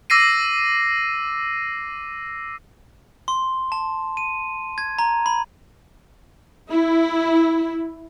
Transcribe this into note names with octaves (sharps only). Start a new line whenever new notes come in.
D6 E6 A#6 C7 D#7
C6
A5
D#7
G#6
A#5
B5
E4